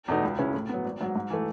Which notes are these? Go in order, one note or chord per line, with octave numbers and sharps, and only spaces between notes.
E2 B2 A3 D#4
C#2
C#3 G#3 C#4 E4
A2
F#3 B3
G#1
G#2 F#3
G#2
E3 A3